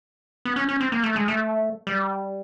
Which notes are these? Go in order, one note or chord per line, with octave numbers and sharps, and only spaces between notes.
B3
C#4
C#4
C4
A#3
A3
G#3
A3
G3